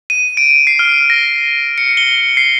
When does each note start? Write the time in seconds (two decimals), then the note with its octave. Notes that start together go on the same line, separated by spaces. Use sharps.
0.10 D#7
0.37 D7
0.67 C7
0.79 F6
1.10 A#6
1.78 C#7
1.97 G7
2.37 C7